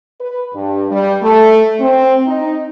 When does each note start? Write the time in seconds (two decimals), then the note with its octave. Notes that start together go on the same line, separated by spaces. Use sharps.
0.21 B4
0.55 G2
0.91 G3
1.22 A3
1.81 C4
2.27 D#4